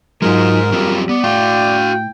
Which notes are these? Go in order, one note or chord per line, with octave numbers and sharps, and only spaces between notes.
G#2 F#3 G#3 D#4 F4 A#4
F#3 G3 C4 F4
B3 D5
A2 F#4 F5 G5